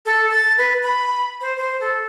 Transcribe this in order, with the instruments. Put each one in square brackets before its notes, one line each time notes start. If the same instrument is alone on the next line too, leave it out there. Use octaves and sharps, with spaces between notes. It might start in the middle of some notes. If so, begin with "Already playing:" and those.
[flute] A4
A6
B4
B5
C5
C5
A4